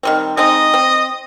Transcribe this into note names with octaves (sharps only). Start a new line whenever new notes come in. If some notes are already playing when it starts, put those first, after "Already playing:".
D#3 G3 C4
G#3 C4 D#4 D#5
C4